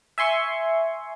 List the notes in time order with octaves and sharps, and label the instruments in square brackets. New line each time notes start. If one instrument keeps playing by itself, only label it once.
[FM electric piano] E5 G#5 C6 C#6